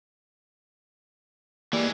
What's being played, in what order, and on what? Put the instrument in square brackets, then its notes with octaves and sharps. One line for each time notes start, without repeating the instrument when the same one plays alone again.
[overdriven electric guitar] E3 G#3 [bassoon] G3 [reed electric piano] A#3